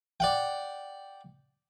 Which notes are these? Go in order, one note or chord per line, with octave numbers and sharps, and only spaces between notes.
D5 F#5 G5